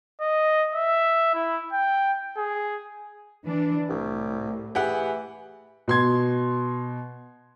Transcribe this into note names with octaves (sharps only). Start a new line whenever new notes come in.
D#5
E5
E4
G5
G#4
E3 D4 D5
C2 A2
E3 G4 G#4 F#5
B2 C6 G#6